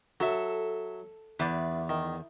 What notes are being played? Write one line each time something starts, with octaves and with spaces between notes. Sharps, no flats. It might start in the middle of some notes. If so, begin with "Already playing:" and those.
F#3 A4 E5
E2 B4 D5
D#3